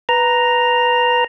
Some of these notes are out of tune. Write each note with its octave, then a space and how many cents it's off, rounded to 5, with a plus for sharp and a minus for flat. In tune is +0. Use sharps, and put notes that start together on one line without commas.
B4 +0 A#5 +0